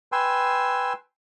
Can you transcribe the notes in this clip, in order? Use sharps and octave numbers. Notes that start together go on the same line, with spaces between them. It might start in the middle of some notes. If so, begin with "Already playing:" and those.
B4 G5 G#5 C6 E6